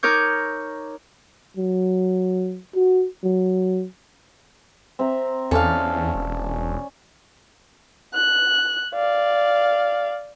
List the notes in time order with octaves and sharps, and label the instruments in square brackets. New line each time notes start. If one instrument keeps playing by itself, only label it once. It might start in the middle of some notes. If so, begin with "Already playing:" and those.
[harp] D#4 A#4 C#5 D6 G6
[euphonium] F#3
F#4
F#3
[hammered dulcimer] C4 E5 A#5
[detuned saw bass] E2 [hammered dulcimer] C#4 D5 [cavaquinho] A4 F5
[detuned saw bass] E1
[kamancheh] F#6
D5 F5